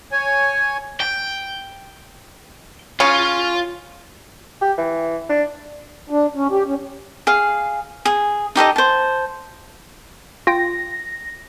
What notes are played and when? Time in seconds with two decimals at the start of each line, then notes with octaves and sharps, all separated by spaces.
0.12 C#5 G#5
1.00 G5
3.00 C#3 C#4 F4
4.61 G4
4.78 E3
5.30 D4
6.10 D4
6.35 C#4
6.51 G4
6.66 C#4
7.27 G#4 F5
8.05 G#4
8.56 D#4 G4 A4 D#5
8.76 C5 A5
10.47 F4 G5 A#6